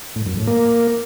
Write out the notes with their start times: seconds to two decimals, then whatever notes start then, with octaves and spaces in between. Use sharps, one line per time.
0.16 A2
0.26 F#2
0.37 A2
0.47 A#3